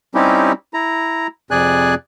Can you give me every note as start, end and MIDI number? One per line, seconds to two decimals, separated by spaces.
0.15 0.52 55
0.15 0.52 60
0.15 0.52 61
0.15 0.52 63
0.15 0.52 64
0.15 0.52 67
0.74 1.27 64
0.74 1.27 82
1.51 1.94 41
1.51 1.94 48
1.51 1.94 68
1.51 1.94 74
1.51 1.94 80
1.51 1.94 90